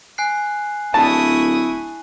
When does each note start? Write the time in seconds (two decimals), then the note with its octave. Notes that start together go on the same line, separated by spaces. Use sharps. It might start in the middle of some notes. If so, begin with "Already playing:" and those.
0.18 G#5 F#6 C7
0.94 D1 E4 A5 C#6 D#6